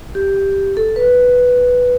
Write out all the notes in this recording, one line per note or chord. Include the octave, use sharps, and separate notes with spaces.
G4
A4
B4